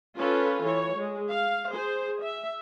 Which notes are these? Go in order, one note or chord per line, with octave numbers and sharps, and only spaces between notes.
C#4 F4 A4 B4
E3 C#5
G#3
F5
G#4 C5
E5